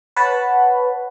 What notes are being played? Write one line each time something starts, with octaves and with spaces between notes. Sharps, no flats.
B4 C#5 F#5 A5 B5